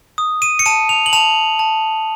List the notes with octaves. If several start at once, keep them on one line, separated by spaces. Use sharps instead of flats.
D#6
D#7
C#7
A5 D#7
F7
F#7
A5 F7
A5